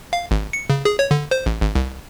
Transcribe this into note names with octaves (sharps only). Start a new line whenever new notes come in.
F5
G#1
C#7
C#3
G#4
C#5
D3
C5
A1
G#1
C2